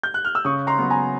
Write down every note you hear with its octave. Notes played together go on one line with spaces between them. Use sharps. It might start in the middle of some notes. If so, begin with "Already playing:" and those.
G6
F#6
F6
E6
C#3 C#6 D#6
A#5 C6
F#3 B3
G#5 A#5